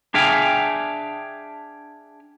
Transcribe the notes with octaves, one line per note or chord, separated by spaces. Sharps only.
D4 G#4 E5 F5 G5 G#5